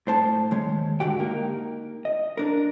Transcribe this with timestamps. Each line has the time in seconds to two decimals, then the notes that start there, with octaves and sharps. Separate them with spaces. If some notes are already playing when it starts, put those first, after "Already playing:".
0.07 A2 C5 A5
0.51 D#2 G#3 C#5
1.00 G#2 D3 F#4 G4 G5
1.20 A#3 D#4 A#4
2.05 D#5
2.37 D4 A#4